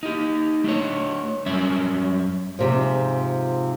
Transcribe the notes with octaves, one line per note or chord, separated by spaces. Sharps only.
D#4 G4
A3 D4 C#5
F#2 G3 C#4 E5
G#2 C3 F3